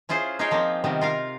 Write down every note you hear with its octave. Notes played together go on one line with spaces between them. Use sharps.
C#4 E4 F4 G#4 C5
D#4 F4 G#4 C#5 F5 G5
F3 A#3 C4
C3 D#3 G3 B3
F4 A#4 F5